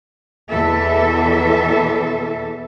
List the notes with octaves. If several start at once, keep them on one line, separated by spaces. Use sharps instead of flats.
E2 B2 E3 A4 E5